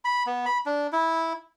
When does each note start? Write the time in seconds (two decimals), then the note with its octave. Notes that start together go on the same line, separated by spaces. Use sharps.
0.05 B5
0.26 B3
0.46 B5
0.66 D4
0.92 E4